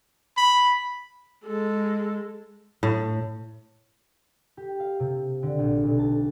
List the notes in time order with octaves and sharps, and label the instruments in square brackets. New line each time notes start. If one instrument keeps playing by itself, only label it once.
[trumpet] B5
[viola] G#3 A4
[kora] A2
[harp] G4
F5
C3
D3
A#1
B1
A5